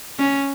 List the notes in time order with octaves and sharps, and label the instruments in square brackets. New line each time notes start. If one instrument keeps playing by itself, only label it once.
[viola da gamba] C#4